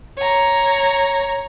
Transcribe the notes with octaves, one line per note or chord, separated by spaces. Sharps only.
C#5 A#5